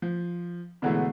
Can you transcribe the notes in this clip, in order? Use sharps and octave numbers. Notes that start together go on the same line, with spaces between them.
F3
B2 D3 E3 F#3 G#3 A3